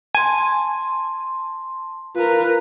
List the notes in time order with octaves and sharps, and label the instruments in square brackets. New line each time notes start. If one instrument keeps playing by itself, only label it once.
[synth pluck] G#5 [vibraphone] A5 C6
[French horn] F4 [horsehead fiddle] A#4 B4